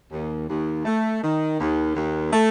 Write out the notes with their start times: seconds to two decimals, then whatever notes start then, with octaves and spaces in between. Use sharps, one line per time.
0.11 D#2
0.48 D#2
0.85 A3
1.22 D#3
1.59 D#2
1.95 D#2
2.32 A3